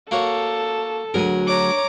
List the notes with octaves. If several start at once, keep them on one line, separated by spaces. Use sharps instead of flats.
A#3 F#4 A4 C#5
D2 F#3 G#4 A#4 G#5
C#5 A#5 D6